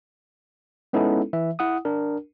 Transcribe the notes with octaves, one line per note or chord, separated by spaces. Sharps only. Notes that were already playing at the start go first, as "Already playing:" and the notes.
G#3 B3 C#4 D#4 E4 A4
E3 E5
E4 F#5 D#6
D4 A#4